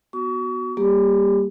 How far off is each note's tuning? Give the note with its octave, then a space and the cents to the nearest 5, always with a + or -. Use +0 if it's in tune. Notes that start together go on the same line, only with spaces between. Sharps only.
B3 +0 F#4 +0 C#6 +35
G3 +0 A#3 +0 G4 +20